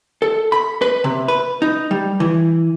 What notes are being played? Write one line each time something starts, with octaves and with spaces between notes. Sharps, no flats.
A4
B5
B4
C3
B4
D#4
G3
E3